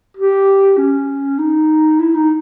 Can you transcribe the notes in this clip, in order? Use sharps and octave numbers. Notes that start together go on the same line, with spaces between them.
G4
C#4
D#4
E4
D#4